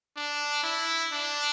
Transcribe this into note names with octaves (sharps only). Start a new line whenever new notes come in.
D4
E4
D4